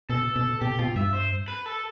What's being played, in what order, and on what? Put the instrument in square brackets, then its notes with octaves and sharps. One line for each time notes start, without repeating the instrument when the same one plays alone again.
[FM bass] B2 [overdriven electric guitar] A4
[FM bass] B2
[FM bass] B2 [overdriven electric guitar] G4
[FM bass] B2 [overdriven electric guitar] F4
[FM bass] G2 [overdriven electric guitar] E5
[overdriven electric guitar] C5
B4
A4